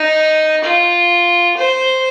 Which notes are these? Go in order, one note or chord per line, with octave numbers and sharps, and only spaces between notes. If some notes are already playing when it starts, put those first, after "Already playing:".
Already playing: D#4
F4
C5